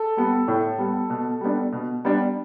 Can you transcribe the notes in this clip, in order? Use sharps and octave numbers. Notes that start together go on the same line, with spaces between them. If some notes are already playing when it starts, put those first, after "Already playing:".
Already playing: A4
G3 B3
A2
G3 B3
B2
G3 B3 D4
B2
G3 B3 D4